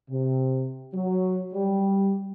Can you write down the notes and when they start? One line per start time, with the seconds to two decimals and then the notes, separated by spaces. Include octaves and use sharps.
0.10 C3
0.95 F#3
1.53 G3